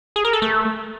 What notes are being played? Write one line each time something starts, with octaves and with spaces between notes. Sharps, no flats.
G#4
A#4
A4
A3